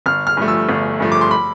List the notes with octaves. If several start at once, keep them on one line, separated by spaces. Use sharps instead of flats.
G1 F6
F6
G2 F3 A3
E6
G1
G2 F3 A3
D6
C6
B5